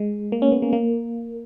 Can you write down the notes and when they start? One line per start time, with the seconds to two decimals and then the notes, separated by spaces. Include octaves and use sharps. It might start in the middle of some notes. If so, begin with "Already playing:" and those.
Already playing: G#3
0.32 A#3
0.42 C#4
0.52 B3
0.62 A#3
0.73 A#3